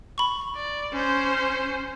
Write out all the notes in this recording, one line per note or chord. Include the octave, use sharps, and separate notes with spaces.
B5 C#6
D5
C#4 C5